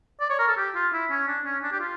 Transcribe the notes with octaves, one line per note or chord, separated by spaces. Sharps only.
D5
C#5
A#4
A4
G4
F4
E4
C#4
D4
C#4
D4
G4
F4